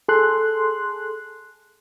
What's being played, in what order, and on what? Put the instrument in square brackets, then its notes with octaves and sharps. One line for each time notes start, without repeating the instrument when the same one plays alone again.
[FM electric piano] G#4 A4 C6 F#6